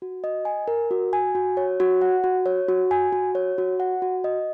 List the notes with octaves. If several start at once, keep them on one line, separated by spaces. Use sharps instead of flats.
F#4
D#5
G#5
A#4
F#4
G#5
F#4
C#5
F#4
F#5
F#4
C#5
F#4
G#5
F#4
C#5
F#4
F#5
F#4
D#5